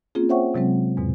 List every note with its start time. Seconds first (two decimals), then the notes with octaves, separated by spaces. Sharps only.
0.15 A#3 C4 C#4 F4 G#4
0.29 C5 C#5 E5 F#5 G5 C#6
0.54 C3 F#3 G#3 C4
0.97 E2 G#2 B2